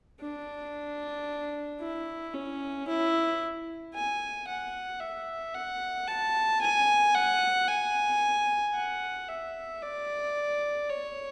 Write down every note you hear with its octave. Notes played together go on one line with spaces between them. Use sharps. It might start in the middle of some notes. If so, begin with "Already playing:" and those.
D4
E4
C#4
E4
G#5
F#5
E5
F#5
A5
G#5
F#5
G#5
F#5
E5
D5
C#5